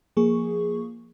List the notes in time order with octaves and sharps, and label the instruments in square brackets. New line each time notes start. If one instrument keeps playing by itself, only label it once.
[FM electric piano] F3 A#3 G#4 C#6